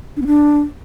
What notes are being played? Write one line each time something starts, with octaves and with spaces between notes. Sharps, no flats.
D4
B3
D4